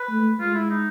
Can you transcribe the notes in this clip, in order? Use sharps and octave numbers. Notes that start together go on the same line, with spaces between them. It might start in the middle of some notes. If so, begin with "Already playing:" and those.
Already playing: B4
A3
G#3 F4
E4
D#4